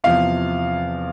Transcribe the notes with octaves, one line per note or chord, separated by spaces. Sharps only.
E2 C3 F3 F5